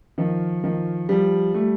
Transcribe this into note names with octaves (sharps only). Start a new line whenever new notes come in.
D#3 F3
D#3 F3
F3 G3
G3 A3